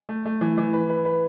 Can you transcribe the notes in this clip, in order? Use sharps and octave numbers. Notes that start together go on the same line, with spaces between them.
A3
A3
E3
E3
B4
B4
B4